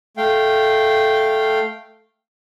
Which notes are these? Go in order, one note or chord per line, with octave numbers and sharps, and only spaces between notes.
A3 F5 G5